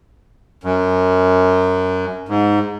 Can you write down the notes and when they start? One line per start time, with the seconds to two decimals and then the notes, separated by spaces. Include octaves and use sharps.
0.64 F#2
2.28 G#2